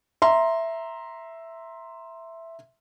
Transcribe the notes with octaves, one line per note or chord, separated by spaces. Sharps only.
E5 A#5 C6